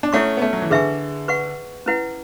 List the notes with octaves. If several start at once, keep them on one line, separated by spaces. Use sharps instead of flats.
D4
A3 C#4 E4 A4 C#5 F#5 C#6
B3
A3 C#4
F#3
E3
D3 G#4 B4 E5 G#5 C#6
B4 F#5 C#6
C#4 E4 B4 F#5